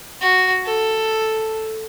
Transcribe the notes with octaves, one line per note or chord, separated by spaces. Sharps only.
F#4
A4